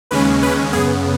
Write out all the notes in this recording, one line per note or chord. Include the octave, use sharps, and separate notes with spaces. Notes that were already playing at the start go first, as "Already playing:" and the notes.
D#2 C#3 G#3 C#4 B4
B4
F#2 C#3 B3 G#4